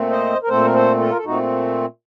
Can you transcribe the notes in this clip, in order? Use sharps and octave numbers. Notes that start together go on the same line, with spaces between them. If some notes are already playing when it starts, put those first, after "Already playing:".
Already playing: A#2 A3 C4
C5 D#5
A#4
A#2 A3 C4 A4 C5
A#4
A4 C5
F4 A4
A#4
A4
A#2 A3 C4 D#4 F#4